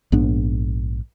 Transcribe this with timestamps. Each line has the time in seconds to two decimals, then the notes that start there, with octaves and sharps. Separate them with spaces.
0.12 A#1 G#2 B3 D4